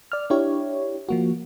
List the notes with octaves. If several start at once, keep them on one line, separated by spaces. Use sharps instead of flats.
D5 F6
D4 E4 G4 C#5
F3 A#3 F#4